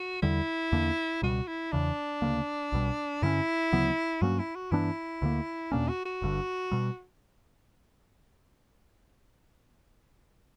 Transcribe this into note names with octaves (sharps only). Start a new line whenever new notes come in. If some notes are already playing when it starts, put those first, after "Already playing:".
Already playing: F#4
E2 D3 G3 E4
E2 D3 A#3 D4
C#2 B2 G3 F#4
E4
E2 C#3 E3 D4
D2 C#3 G3 A#3
B1 B2 G3
G2 D3 G3 C#4 E4
D2 C#3 F#3 B3
G2 F#3 A#3 C#4 F#4
E4
F#4
G2 E3 B3 D4 E4
D2 D3 A#3
E2 B2 A#3 C#4 D4
F#4
F#4
G1 G2 D3
B2 G3